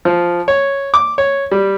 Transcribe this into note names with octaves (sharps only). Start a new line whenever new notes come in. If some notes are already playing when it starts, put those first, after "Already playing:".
F3
C#5
D6
C#5
G3